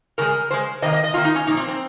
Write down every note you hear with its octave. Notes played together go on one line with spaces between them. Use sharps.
C#3 G#3 A#4
C#3 G#3 C5
C3 D#3 A#3 D#5
D#5
D#5
C3 D#3 A#3 F4
D#4
C#4
A#2 F3 A#3 D#4
C4
C4